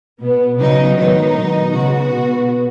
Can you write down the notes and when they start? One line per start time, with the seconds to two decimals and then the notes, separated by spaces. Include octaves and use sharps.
0.21 B2 B3
0.59 C#3 F#3 B3 D#4
0.98 G#2 D#3 F#3 B3 D#4
1.36 B2 B3
1.74 C#3 G#3 B3 F#4
2.13 B2 B3